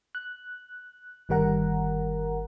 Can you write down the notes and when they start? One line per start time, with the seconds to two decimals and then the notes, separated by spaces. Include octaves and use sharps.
0.15 F#6
1.29 G1 D#3 G3 A#4 F#5 A#5